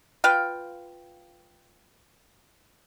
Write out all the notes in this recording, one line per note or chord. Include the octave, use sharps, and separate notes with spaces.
F4 B4 F5 G5